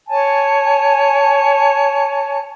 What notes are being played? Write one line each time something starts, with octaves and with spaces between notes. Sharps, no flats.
C#5 G#5 A5